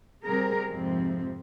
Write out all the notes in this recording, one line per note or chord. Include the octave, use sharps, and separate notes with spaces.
C3 G3 C4 G#4 A#4
F2 G#2 C3 F3 C4